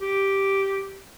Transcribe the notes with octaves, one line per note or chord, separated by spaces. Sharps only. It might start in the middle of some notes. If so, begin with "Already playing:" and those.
G4